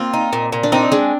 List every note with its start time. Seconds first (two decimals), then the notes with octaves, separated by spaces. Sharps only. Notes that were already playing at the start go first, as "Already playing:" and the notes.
Already playing: A#3 C4 F4
0.14 D#4
0.33 A#2
0.52 A#2
0.63 D4
0.72 C4 D#4
0.92 G#3 D4